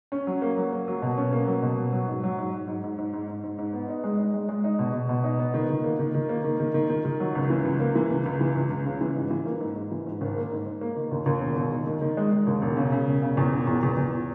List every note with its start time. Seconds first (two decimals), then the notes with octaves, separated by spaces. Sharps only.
0.12 C#4
0.27 F#3
0.42 A#3
0.57 F#3
0.72 A#3
0.88 F#3
1.02 B2
1.17 C#4
1.33 A#3
1.47 F#3
1.62 B2
1.78 F#3
1.93 F#3
2.08 G#2
2.23 F#3
2.38 G#2
2.53 G#2
2.68 G#2
2.83 G#2
2.98 G#2
3.13 G#2
3.29 G#2
3.43 G#2
3.58 G#2
3.73 B3
3.89 D#4
4.04 G#3
4.18 D#4
4.34 G#3
4.49 G#3
4.64 D#4
4.79 B2
4.94 B2
5.09 B2
5.24 D#4
5.39 B3
5.54 D#3
5.70 D#3
5.84 A#3
5.99 D#3
6.14 D#3
6.29 A#3
6.44 D#3
6.60 D#3
6.74 D#3
6.90 D#3
7.05 D#3
7.20 F#3
7.35 C#2
7.50 E3
7.65 C#2
7.80 A#3
7.95 E3
8.10 C#2
8.26 C#2
8.41 E3
8.55 C#2
8.70 C#2
8.86 C#3
9.01 E3
9.16 G#2
9.31 E3
9.45 A#3
9.60 G#2
9.76 G#2
9.91 E3
10.06 G#2
10.21 G#1
10.36 A#3
10.51 G#2
10.66 G#2
10.81 A#3
10.96 D#3
11.11 D#2
11.26 D#2
11.41 E1
11.56 D#2
11.72 D#3
11.86 D#3
12.02 D#3
12.17 G#3
12.32 G#3
12.47 D#2
12.62 E1
12.77 C#3
12.92 C#3
13.07 E1
13.22 C#3
13.37 E2
13.53 E1
13.67 E2
13.83 E2
13.97 E2